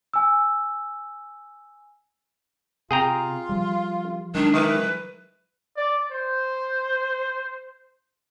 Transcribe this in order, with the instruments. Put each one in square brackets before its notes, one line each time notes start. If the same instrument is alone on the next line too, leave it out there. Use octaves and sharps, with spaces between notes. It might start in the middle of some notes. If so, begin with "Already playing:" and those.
[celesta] G#5 E6
[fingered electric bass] C3 [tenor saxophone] F4 [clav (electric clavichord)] G#4 G5 A#5
[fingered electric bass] F3 G3
[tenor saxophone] D#3 [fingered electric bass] F#3 G#3 [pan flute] D4
[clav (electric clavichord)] D#3 [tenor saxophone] E3 [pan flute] B4
[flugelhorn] D5
C5